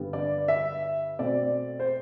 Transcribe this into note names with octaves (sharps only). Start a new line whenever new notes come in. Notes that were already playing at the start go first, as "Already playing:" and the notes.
Already playing: G2 D3 G3 B3
D5
E5
B2 A3 C4 D5
C5